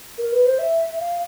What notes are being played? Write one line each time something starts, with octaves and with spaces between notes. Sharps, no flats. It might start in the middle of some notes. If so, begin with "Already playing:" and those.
A#4
B4
C5
E5
F5